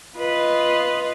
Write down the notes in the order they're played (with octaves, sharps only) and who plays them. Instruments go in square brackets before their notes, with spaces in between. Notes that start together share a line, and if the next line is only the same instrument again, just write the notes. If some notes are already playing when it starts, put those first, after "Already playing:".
[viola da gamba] F4 B4 D#5